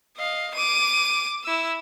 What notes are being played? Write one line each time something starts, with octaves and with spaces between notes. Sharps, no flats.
D#5 F5
D6 D#7
E4 E6